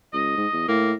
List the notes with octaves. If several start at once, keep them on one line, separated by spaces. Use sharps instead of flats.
C#2 D#5
G#2
E2
A2 A#3